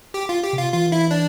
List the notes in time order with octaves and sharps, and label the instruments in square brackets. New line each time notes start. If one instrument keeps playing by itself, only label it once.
[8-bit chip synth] G4
F4
G4
[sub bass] C3
[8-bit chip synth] F4
[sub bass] E3 [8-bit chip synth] F4
[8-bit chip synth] E4
D4